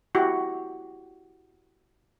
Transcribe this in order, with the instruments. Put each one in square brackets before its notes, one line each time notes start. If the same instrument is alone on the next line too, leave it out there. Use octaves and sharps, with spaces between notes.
[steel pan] E4 F#4 G4